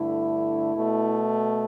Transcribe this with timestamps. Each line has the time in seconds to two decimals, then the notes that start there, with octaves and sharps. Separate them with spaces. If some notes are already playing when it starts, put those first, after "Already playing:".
Already playing: G2 D3 A3 E4
0.77 B2 A3